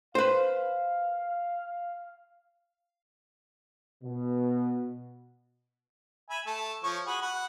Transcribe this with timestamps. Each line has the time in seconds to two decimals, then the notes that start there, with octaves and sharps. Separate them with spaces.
0.15 B4 C5 F5
4.04 B2
6.30 E5 G#5 B5
6.46 A3 A5
6.84 F3 C#5 C#6
7.07 F#4 G#4 B5
7.22 F#4 F#5 B5